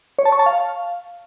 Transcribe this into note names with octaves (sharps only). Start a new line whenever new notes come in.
C#5
A5
C#6
A5
F5